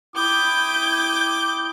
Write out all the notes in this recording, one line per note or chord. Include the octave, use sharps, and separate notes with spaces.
E4 G5 D6 D#6 G6